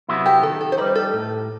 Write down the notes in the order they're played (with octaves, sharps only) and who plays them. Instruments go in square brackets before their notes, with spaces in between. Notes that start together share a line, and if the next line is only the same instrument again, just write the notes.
[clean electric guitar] C3 F#3 B3 E4
[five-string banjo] G4
[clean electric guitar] D#3 [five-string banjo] A4
[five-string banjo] A4
C5
[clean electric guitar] G3 D#4 [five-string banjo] B4
[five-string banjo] A4
[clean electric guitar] A2